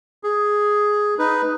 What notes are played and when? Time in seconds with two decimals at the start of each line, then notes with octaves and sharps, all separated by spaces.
0.23 G#4
1.19 D#4 B4